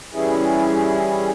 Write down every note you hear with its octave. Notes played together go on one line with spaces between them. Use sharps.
E3 G3 C#4 E4 G#4